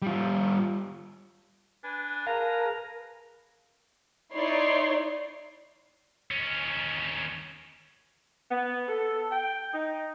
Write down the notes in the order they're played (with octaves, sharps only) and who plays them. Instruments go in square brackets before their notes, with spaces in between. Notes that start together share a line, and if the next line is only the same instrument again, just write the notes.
[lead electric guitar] G3 F4
[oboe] D4 [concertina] B4 G#5
[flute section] G#4 A#4 A5 [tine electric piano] F5 [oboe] A#5
[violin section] D#4 E4 C#5 D5 C6 C7
[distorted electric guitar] D#2 C#4
[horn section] B3
A4
G5
D#4